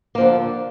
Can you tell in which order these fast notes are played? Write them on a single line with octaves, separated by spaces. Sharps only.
A#3 F3 D3